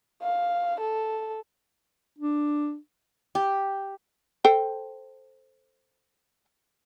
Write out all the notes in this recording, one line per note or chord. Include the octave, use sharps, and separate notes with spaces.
F5
A4
D4
G4
A4 C5 G5